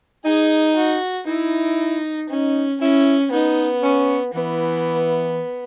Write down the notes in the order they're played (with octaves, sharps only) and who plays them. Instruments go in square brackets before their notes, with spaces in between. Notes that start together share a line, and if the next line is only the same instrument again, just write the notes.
[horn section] D#4 [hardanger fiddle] G#4
[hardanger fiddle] F#4
[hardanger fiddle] D#4 [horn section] E4
[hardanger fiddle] C#4 [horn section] D#4
[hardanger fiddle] C#4 [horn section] E4
[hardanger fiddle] B3 [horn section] D#4
[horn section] C#4
[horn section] E3 [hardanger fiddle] B3